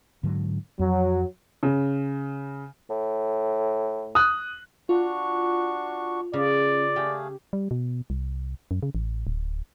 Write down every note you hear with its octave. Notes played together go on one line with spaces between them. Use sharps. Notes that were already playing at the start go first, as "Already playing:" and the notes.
G#2 D3 F#3
F2 F#3
C#3
A2
D#6 F#6
D4 F4 F#4 C#6
C#3 D5
A3 G4 G#4 F5
G3
B2
C2
F#2
C#3
A1
D1